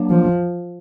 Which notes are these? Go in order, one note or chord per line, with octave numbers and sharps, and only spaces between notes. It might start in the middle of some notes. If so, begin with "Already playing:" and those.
Already playing: F#3 A#3 D4
F3